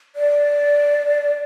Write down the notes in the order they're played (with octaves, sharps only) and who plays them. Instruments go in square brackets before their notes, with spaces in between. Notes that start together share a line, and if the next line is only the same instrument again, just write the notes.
[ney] D5